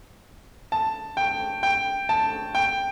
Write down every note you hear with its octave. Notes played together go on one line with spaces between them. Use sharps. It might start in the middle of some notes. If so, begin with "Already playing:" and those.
A5
G5
G5
A5
G5